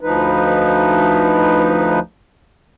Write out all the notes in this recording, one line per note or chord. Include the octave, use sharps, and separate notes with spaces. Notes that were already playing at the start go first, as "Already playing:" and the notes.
D2 F3 D#4 B4